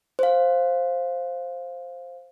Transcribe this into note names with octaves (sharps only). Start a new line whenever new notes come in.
C5 F5